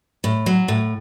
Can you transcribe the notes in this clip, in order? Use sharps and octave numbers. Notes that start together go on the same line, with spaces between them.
A2
F#3
A2